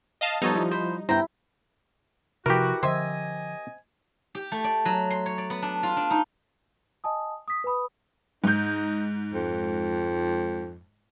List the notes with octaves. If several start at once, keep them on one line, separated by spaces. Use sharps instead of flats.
D#5 F5 A5
F3 G3 B3 D#4 A4 C#5 A5
F3 E4 F4
C5 B5
G2 B3 E4 C5 G5 A#5
C3 E3 F3 F#4 G4 A#4
D3 D#3 F3 C4 D#5 E5 G#5
G4
A3
D5
F#3
C6
C#5
D5
B3
D4
F4
D4
D#4
D#5 G#5 A5 D#6
D#6 B6
B4 G#5 B5 D#6
G#2 D#4 G6
F2